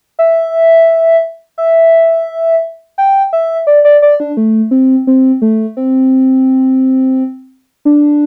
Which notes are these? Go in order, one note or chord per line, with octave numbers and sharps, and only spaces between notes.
E5
E5
G5
E5
D5
D5
D5
D4
A3
C4
C4
A3
C4
D4